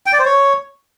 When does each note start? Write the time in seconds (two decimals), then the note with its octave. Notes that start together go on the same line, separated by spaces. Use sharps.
0.06 G5
0.13 D5
0.19 C5
0.26 C#5